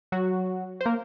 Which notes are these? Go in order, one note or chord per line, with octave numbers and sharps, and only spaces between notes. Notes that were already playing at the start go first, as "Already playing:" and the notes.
F#3 F#4
C5
A#3 A#4